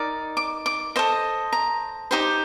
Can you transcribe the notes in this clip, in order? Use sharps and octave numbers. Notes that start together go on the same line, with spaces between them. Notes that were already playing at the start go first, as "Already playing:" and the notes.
Already playing: D#4 A#4 D5
D6
D6
A4 C5 D#5
A#5
D#4 G4 C5